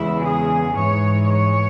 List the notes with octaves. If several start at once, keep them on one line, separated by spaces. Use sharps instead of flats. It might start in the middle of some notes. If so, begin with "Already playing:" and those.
Already playing: E2 C#3 G#3 E4
G#4
G#2 E3 G#3 C#5
C#5